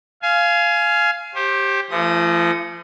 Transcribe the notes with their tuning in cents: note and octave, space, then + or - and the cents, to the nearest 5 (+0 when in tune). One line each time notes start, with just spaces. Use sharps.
F5 -10 G#5 +20
G4 +0 C5 +35
F3 -40 A3 +15 D#6 +0